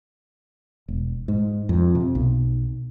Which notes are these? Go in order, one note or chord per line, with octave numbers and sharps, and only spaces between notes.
E1
G#2
F2
C3
B1